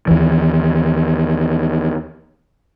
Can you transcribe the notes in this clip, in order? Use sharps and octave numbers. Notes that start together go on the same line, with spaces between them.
D#2 E3